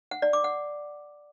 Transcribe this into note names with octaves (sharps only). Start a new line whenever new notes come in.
F#5
D5
D6
F#5